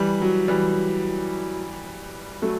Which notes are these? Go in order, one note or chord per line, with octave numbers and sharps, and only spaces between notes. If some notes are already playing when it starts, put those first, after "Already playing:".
Already playing: E3 G3
F#3
E3 G3
F#3 A3